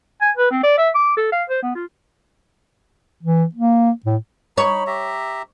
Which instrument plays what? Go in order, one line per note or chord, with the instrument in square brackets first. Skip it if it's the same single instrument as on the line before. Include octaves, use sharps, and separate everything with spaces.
[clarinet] G#5
B4
C4
D5
E5
D6
A4
F5
C5
B3
F4
[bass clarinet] E3
A#3
A2
[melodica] D#4 B5 [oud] C#5
[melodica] G4 E5 A#5